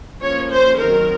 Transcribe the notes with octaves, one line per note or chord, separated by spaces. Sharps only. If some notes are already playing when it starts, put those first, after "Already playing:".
F3 A#3 C#4 C#5
C5
D#3 F#3 C4 A#4